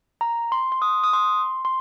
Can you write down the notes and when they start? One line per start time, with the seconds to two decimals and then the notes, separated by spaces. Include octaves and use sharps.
0.21 A#5
0.52 C6
0.72 C6
0.82 D#6
1.04 D#6
1.13 C6
1.65 C6